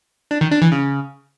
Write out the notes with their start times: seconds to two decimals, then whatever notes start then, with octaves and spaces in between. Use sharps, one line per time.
0.31 D4
0.41 D#3
0.51 D4
0.62 E3
0.72 C#3